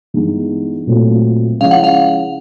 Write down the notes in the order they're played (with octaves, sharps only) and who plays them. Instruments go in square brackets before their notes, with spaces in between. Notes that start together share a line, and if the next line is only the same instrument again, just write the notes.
[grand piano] G2 E3 G#3 B3 D#4
A#2 F#3 A3 C4 F4
[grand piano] C#3 F3 G#3 C#4 E4 [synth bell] F5
[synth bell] F#5
F5